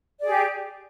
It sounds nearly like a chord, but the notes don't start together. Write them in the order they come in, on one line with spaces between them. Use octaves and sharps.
D5 G#4 G4